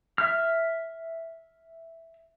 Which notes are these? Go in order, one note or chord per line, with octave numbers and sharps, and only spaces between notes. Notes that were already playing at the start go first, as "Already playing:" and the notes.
E5 F6